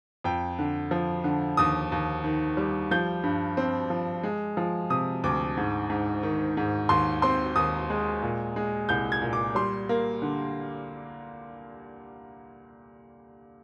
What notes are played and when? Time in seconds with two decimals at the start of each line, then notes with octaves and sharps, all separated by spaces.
0.24 F2 G5
0.59 D3
0.91 F3
1.24 D3
1.57 D#2 D#6
1.92 D#2
2.24 D#3
2.57 G3
2.91 F3 G6
3.24 G2
3.57 C4
3.90 F3
4.23 G#3
4.57 F3
4.90 C3 D#6
5.24 D2 D6
5.57 G#2
5.90 G#2
6.23 D#3
6.57 G#2
6.89 D#2 C6
7.22 C4 C6
7.56 D#2 D#6
7.90 G#3
8.22 A#2
8.56 G#3
8.89 C2 G6
9.12 G#6
9.22 A#2
9.33 D6
9.55 G3 C6
9.89 A#3
10.22 D3